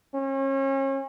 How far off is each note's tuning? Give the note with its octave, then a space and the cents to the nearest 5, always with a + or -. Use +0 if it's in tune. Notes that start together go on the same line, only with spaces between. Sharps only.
C#4 -35